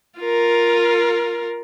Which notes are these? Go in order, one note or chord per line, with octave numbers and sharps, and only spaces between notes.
F4 A#4